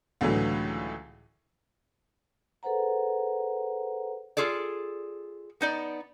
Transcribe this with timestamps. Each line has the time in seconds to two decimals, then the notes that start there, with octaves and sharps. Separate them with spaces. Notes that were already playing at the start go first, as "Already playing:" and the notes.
0.21 C#2 A2 D3 E3 F#3 A3
2.63 G#4 A4 B4 C5 F#5 A#5
4.37 F4 G#4 A4 D5
5.61 B3 D#4 D5